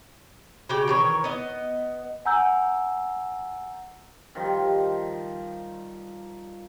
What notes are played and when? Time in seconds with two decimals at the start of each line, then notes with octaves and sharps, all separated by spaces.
0.69 C#3 F#4 G4 G5
0.88 D#3 E3 C#5
1.24 B3 D#5
2.25 F#5 G#5 A#5 E6 G6
4.35 D#3 F3 G3